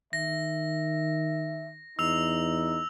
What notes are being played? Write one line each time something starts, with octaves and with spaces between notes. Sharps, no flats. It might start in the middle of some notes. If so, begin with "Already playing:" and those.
D#3 E5 A#6
E2 D#4 E6 F7